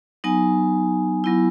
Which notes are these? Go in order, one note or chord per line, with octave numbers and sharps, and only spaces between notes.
F#3 B3 D#4 G#5
F#3 B3 E4